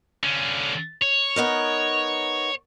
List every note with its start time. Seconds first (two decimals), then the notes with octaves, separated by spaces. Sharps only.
0.23 D3 C#4
1.02 C#5
1.36 B3 D#4 A#4